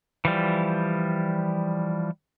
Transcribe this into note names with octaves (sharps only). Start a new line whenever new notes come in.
E3 F3 G3